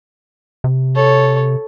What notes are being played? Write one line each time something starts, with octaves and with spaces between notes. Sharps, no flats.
C3
A4 C#5